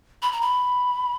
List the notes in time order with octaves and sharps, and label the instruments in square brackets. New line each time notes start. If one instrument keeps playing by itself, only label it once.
[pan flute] B5
A#5
B5